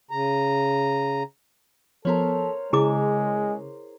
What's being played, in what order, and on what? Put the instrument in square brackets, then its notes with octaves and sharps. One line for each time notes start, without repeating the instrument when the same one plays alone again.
[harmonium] C#3 A#5
[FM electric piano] F3 B3 [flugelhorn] A4 [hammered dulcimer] A#4 C5 C#5
[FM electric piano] C#3 [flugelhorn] G#3 [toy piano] E4 G#4 D6